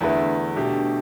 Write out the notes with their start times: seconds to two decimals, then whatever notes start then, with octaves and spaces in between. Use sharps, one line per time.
0.01 E2 D3 A3 E4 B4
0.56 B2 A3 D4 G4